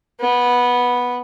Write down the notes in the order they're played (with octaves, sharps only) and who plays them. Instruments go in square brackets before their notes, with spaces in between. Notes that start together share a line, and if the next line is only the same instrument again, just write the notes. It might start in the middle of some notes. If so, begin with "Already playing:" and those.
[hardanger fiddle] B3